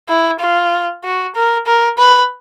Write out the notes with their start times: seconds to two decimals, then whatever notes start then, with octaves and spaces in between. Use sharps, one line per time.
0.09 E4
0.40 F4
1.04 F#4
1.35 A#4
1.66 A#4
1.98 B4